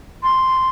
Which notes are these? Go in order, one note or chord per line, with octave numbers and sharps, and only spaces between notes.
C6